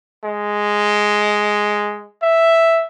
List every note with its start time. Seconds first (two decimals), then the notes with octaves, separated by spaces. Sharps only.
0.24 G#3
2.23 E5